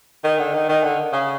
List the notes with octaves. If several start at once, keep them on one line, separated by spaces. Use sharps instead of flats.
D#3
D3
D#3
D#3
D3
C#3